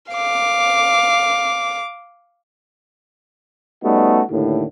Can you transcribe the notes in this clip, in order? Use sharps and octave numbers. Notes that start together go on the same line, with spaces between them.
F5 D6
G3 A3 B3 C#4 D#4 F#4
D#2 A2 D3